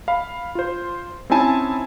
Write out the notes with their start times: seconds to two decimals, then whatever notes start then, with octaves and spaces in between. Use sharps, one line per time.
0.08 F5 B5
0.55 F4 C5
1.30 C4 C#4 D#4 E4 G#5 A5